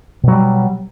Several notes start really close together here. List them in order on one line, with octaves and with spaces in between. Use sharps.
B2 F#3 G3